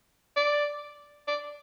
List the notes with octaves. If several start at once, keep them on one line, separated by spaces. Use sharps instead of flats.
D5
D5